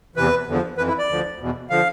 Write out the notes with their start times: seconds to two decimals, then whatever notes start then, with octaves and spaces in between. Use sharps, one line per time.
0.16 E2 C3 E3 B4
0.47 E2 D3 F3
0.78 F2 E3 B4
0.88 E4
0.98 D5
1.09 D2 D3 F3
1.40 E2 B2
1.70 D3 F3 F5